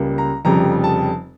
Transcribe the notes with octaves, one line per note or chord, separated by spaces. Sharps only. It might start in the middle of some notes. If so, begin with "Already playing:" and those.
Already playing: C#2 C#3 G3 A#3
A#5
F1 F2 C#3 G3 A#5
A5